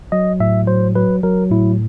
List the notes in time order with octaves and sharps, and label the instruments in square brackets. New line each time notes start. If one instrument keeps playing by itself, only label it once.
[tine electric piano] F#3 D#5
A2 E5
F#3 C5
F#3 B4
F#3 A#4
A2 E4